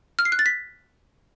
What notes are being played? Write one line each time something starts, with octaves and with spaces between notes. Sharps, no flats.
F6
C7
F#6
A6
B6